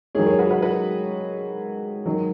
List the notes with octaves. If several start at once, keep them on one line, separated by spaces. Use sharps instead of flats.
G#2 D#3 F#3 G#4 C#5
G#4 C#5
F#4 B4
F#4 B4
F#4 B4
G#2 D#3 F#3